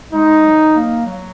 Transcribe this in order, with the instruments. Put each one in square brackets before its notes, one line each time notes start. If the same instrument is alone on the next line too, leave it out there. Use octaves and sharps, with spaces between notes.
[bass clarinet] G#3 [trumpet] D#4
[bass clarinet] F#3
A#3
F#3